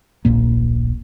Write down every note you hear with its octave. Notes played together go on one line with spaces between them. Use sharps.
D1 A#1 A#2 A#3